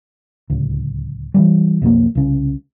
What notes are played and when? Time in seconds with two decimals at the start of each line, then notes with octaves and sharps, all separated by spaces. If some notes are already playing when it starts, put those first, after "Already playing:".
0.50 D1 C#2
1.34 E3 F3 G3
1.82 B1 F2 G3 A#3
2.15 C2 C#3